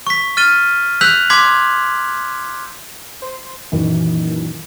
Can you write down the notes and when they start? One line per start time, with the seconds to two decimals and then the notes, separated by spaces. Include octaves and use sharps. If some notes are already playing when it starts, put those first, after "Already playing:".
0.07 C#6 B6
0.37 F6 A6 D#7 G7
1.01 E6 F#6 G6 B6 F7 F#7
1.30 C6 D6 G#6 B6 F#7
3.22 C5
3.72 F#2 A#2 D#3 E3